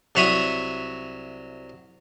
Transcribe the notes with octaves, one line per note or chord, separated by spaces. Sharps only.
C2 F#3 C#5 E5 B5 D#6